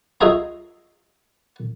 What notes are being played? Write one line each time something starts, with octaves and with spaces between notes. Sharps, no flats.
F4 G#4 D#5 E5 G#5 A#5